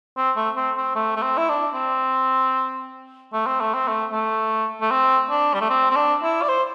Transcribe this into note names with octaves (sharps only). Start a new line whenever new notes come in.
C4
A3
C4
C4
A3
A3
C4
E4
D4
C4
A3
C4
A3
C4
A3
A3
A3
C4
D4
G3
A3
C4
C4
D4
E4
D5
C5